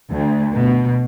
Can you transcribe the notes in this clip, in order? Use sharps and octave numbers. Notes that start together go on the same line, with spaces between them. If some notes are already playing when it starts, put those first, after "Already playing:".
D2
B2